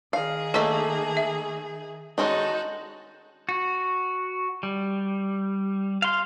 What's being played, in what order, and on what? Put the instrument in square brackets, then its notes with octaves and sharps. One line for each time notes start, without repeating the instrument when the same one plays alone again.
[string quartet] D#3 G#4 [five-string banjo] F5
[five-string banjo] A3 A#3 [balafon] A4 D#5
[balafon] E5
[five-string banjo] D#3 G#3 C#4 [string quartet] D#4 F#4 A4
[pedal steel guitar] F#4
G3
F5 C6